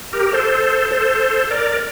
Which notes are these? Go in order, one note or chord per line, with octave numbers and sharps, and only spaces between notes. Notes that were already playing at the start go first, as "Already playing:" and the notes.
G4 A#4
A#4
A4 C5
A4 C5
A#4 D5